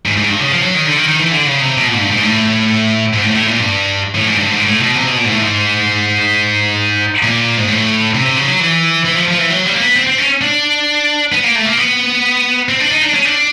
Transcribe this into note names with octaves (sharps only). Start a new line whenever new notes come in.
G#2
G#2
G2
C#3
F3
F#3
D#3
D3
D#3
D#3
E3
D3
C#3
C3
B2
A#2
G#2
G2
G#2
A2
G#2
A2
A2
A#2
G2
A2
G#2
G2
G#2
A2
B2
C3
B2
A#2
G#2
A2
G#2
A#2
G#2
A2
C3
C3
C#3
F#3
E3
E3
F3
F3
E3
F#3
G3
A#3
B3
C4
C4
C#4
D4
B3
A#3
A3
A#3
B3
C4
D4
D#4
D4
C#4
D4